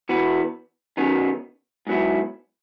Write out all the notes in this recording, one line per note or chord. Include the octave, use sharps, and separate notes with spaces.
E3 B3 F#4 B4
F#2 D#3 F#3 B3 D#4
G#2 F#3 B3 E4